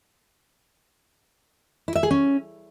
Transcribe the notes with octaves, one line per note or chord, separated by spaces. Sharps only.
E4
E5
G#4
C#4